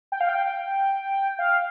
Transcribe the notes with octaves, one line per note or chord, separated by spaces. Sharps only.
G5
F5
G5
F5